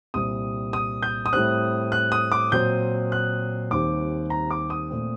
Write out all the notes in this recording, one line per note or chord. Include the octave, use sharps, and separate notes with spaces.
C2 A#2 G3 C4 D#6
D#6
G6
D#6
A2 G3 C4 F#6
F#6
D#6
D6
A#2 F#3 C4 G6
F#6
D#2 D#3 G3 C4 D6
A#5
D6
D#6
A#2 A3 C4